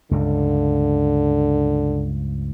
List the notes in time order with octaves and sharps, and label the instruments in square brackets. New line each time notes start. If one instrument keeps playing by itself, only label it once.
[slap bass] C#2 G2 [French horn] D3